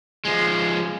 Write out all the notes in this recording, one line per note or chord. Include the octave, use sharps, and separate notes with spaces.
F3 G#3